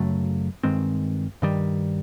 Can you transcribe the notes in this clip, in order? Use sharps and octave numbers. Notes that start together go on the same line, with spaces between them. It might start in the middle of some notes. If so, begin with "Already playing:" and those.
Already playing: F#2 C#3 F#3 A3
G2 D#3 G#3 C4
G2 D#3 G3